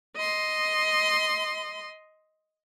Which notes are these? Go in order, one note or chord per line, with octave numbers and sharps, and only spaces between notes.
D#5 C6